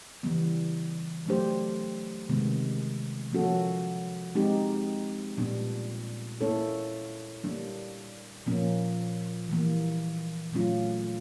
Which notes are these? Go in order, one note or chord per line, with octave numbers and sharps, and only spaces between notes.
C#3 E3 G3 B3
F#3 A3 D4 G4 C5
C3 D#3 G#3 B3
F3 A#3 C#4 F#4 A4
G#3 C4 D#4 G4
A#2 G3 B3 D4
A#3 C#4 E4 A4 C#5
G3 A#3 D4
A#2 F3 A#3 C#4
E3 G3 A#3
A#2 F#3 A3 C#4 F4